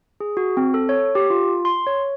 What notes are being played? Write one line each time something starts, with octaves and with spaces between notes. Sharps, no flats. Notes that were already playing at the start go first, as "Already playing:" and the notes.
G#4
F#4
C4
A4
C#5
G4
F4
C6
C#5